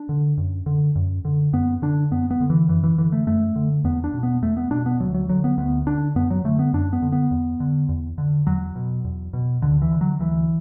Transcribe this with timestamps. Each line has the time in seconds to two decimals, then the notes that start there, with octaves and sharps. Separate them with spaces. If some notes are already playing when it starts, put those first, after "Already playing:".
Already playing: D4
0.09 D3
0.38 F#2
0.66 D3
0.96 F#2
1.25 D3
1.53 F#2 B3
1.82 D3 D4
2.11 F#2 B3
2.31 B3
2.40 D3
2.50 E3
2.68 F#2 E3
2.83 E3
2.98 D3 E3
3.12 A3
3.26 F#2 A3
3.56 D3
3.84 E2 B3
4.04 D4
4.14 B2
4.23 B3
4.42 E2 A3
4.57 B3
4.71 B2 D4
4.86 B3
5.00 D2 F#3
5.14 F#3
5.29 D3 F#3
5.44 B3
5.58 D2 B3
5.87 D3 D4
6.16 F#2 B3
6.30 F#3
6.44 D3 A3
6.59 B3
6.73 F#2 D4
6.93 B3
7.02 D3
7.12 B3
7.31 E2
7.60 D3
7.89 E2
8.18 D3
8.47 E2 F#3
8.76 B2
9.05 E2
9.33 B2
9.62 D2 D3
9.82 E3
9.91 D3
10.01 F#3
10.20 D2 E3